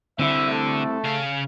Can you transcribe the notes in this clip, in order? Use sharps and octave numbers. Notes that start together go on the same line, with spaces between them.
D3 C4 E4 E5
A3 A4
C#3 F5